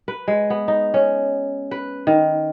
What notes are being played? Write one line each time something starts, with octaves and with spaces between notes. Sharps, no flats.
B4
G#3
B3
D#4
C#4
B4
D#3